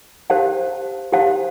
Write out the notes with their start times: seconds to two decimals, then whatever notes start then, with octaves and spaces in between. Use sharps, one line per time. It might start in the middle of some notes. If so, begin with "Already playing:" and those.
0.30 G4 C5 F5 A5
1.12 G4 C5 F5 A5